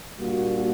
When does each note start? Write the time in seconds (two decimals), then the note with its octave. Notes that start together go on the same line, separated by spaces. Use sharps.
0.20 A#2 G3 A#3 D4 F#4